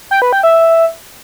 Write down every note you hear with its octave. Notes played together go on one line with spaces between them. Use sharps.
G5
B4
G5
E5